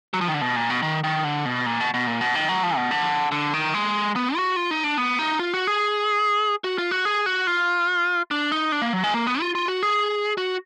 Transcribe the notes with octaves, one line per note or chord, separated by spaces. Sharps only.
F#3
F3
D#3
D3
B2
A#2
B2
D#3
D#3
D3
B2
A#2
B2
B2
A#2
B2
D#3
F#3
F3
B2
D3
D3
D#3
G#3
B3
F#4
F4
D#4
D4
B3
D#4
F4
F#4
G#4
F#4
F4
F#4
G#4
F#4
F4
D4
D#4
D4
A#3
F#3
G#3
A#3
B3
F4
F4
F#4
G#4
F#4